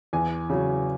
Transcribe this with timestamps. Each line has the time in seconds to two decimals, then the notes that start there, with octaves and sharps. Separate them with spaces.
0.13 E2 G#5
0.50 C#3 F#3